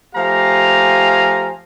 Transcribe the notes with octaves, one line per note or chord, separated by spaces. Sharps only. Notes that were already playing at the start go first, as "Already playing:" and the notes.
F3 A3 G4 F5 G#5 A#5